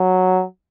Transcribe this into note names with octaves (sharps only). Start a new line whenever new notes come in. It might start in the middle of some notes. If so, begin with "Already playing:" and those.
Already playing: F#3